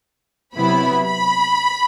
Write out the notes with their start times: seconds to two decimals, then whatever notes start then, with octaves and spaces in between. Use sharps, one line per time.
0.54 C3 F#3 B3 E4 B5
1.06 B5